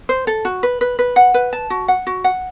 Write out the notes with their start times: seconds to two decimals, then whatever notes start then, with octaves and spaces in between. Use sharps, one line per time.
0.09 C5
0.27 A4
0.45 F#4
0.63 B4
0.81 B4
0.99 B4
1.16 F#5
1.34 B4
1.53 A5
1.70 F#4
1.88 F#5
2.07 F#4
2.24 F#5